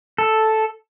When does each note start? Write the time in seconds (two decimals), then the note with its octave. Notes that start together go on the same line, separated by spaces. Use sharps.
0.18 A4